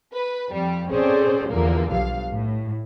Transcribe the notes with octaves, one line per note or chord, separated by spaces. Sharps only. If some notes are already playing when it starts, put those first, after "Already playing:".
B4
F2 G3
C4 C#4 G#4 A4 C5 D5
E2 A#2 D3 F3 G3 A#3
B1 G2 F5
A2